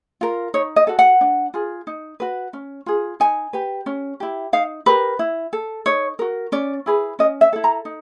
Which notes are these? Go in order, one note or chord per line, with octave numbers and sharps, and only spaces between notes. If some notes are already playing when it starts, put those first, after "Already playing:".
F4 A#4
D#4 C#5
D#5
F#4 A4
F#5
D4
F4 G#4
D#4
F#4 B4
C#4
F4 G#4
D#4 G#5
G4 B4
C#4
E4 G4
D#4 F5
G4 A#4 B4
E4
A4
D#4 C#5
F#4 A#4
C#4 D5
E4 G#4 B4
C#4 D#5
E5
E4 A4
A#5
D#4